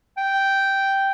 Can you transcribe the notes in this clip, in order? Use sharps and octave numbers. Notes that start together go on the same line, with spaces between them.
G5